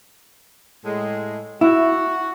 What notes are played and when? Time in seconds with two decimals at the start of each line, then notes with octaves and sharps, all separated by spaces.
0.85 A2 G#3
1.61 E4 F#4